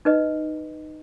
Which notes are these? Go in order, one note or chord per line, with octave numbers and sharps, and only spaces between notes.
D#4 B4 D#5